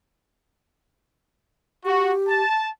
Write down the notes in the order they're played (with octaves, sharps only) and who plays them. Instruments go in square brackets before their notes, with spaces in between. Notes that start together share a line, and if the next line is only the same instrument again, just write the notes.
[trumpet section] F#4 [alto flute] G4
[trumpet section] A5